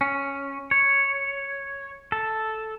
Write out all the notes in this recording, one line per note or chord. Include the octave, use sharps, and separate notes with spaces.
C#4
C#5
A4